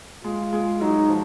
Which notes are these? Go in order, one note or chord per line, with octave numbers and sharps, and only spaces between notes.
G#3 F4
G#3
F#3 D#4
F3